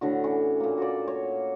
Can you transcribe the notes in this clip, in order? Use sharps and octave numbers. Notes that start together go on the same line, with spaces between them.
A2 D3 F#4
E3 C#4 C#5 D5
A#2 A#3
F#4 C#5 D5
C#5